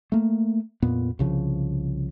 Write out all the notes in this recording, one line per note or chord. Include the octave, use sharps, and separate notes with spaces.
A3 A#3
F2 A#2 B3
C2 C#3 F3